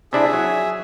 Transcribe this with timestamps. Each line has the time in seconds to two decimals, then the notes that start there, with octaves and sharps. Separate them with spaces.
0.13 C3 D4 E4 G#4 E5
0.33 F#3